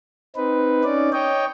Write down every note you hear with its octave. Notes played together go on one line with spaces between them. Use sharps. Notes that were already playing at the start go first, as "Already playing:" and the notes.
C4 D#4 B4
C#4 D#4 D5
C#5 D#5 G5